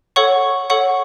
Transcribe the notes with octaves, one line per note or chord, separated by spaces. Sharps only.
A4 C#5 F#5 C#6
A4 C#5 F#5 C#6